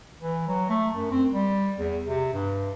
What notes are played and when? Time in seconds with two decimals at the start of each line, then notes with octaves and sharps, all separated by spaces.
0.21 E3
0.47 F#3
0.69 A3
0.95 F#2
1.11 C4
1.33 G3
1.79 E2
2.07 C3
2.33 G2